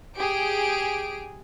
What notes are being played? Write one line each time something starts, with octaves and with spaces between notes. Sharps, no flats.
G4 G#4 D7